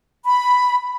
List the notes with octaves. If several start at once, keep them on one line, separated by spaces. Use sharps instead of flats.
B5